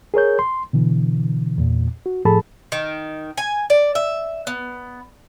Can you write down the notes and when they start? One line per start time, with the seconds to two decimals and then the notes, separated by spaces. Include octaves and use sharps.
0.14 G#4 A#4 C#5 G6
0.39 C6
0.73 B2 D3 E3
1.58 E2 A#2
2.06 F#4
2.25 A2 F3 G#4 A4 A5 B5
2.72 D#3
3.37 G#5
3.70 D5
3.95 E5
4.47 B3